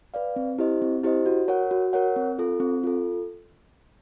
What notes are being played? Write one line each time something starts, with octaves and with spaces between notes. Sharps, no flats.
B4 D5 F5
C4
E4 G4 C5 D#5
C4
E4 G4 C5 D#5
F#4
A#4 C#5 F#5
F#4
A#4 C#5 F#5
C4
F4 A4
C4
F4 A4